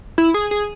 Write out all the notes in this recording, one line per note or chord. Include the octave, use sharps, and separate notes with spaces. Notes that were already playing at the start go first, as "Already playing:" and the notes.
E4
G#4
G#4